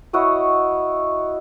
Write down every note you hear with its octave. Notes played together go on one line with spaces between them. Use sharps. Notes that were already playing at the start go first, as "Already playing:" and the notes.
E4 F#4 C#5 D#5